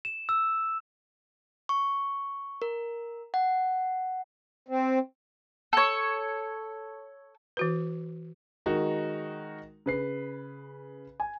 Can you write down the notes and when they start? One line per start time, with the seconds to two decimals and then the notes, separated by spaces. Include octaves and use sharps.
0.05 E7
0.29 E6
1.69 C#6
2.62 A#4
3.34 F#5
4.68 C4
5.73 A4 C#5
7.57 E3 F#4 B4
8.66 D#3 G#3 D#4 F#4 A#4
9.86 C#3 B4 C7
11.20 G#5